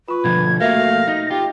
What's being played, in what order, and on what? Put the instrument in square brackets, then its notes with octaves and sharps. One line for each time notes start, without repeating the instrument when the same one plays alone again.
[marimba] F4 C#6 [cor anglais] B4
[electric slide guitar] B2 D3 F3 [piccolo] G#6
[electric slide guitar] A3 A#3 [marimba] F#4 A#4 E5 [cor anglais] F5 [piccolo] A#6
[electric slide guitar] D#4
[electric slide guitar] F4 [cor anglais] G4